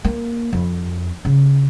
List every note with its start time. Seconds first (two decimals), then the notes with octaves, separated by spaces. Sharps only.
0.05 A#3
0.53 F2
1.25 C#3